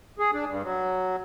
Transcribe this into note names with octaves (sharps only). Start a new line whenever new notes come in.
G#4
D4
G2
F#3